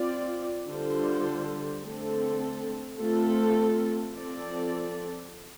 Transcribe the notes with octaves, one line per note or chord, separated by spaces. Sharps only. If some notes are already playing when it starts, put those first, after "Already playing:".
Already playing: C4 F4 D5
D3 G3 F4 A4 C5
D3 A3 C4 A4
A3 C4 F4 A4
F3 C4 A4 D5